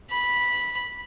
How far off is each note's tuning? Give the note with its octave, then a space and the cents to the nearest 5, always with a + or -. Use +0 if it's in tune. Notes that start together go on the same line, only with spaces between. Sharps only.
B5 -10